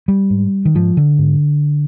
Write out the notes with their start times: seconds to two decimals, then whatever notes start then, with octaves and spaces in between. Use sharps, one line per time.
0.08 G3
0.30 G#2
0.65 D#3
0.75 G#2 F3
0.97 D3
1.19 G#2